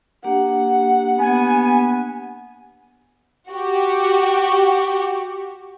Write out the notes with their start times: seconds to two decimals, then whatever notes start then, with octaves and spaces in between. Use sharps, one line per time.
0.24 A#3 D4 G4 F#5
1.18 B3 G#5
3.50 F#4 G4